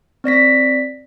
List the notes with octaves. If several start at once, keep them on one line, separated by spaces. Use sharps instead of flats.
C4 D5 A#6 B6